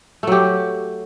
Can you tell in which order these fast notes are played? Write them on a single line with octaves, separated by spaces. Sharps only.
A3 F#3 G4